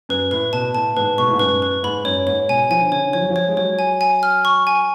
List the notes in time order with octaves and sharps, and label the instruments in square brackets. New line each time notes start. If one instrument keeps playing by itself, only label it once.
[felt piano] F#2 [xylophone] B4
[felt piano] A2 [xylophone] B4
[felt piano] B2 [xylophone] A5
[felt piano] A2 [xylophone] A5
[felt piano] G#2 [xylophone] B4
[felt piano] B2 [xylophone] C#6
[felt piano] A2
G#2
[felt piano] F#2 [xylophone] B4
[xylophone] B4
[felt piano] G#2 [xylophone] B5
[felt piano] F#2 [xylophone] C#5
[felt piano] G#2 [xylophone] C#5
[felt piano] B2 [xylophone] G#5
[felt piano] F3 [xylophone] G#5
[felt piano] D3
[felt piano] C#3 [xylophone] C#5
[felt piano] D3
[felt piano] F3 [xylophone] C#5
[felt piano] F#3
F3
[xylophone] C#5
[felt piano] G#3
[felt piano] F#3 [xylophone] C#5
[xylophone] G#5
G#5
F6
C#6
G#5